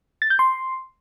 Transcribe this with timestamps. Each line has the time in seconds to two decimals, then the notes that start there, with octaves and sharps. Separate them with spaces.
0.22 A6
0.30 G6
0.39 C6